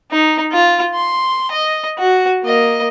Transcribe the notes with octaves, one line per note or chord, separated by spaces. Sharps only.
D#4
F4
C6
D#5
F#4
A#3 D#5